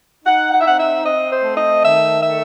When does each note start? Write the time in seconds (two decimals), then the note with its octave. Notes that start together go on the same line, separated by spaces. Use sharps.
0.25 D#4 F#5
0.51 F#5
0.59 E5
0.65 C4 F#5
0.78 E5
1.04 C4 D#5
1.30 C5
1.44 A3
1.57 D#5
1.83 D#3 E5
2.23 A3 E5